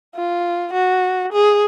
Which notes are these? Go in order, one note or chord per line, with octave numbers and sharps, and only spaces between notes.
F4
F#4
G#4